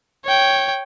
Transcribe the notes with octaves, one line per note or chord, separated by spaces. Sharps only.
C#5 G5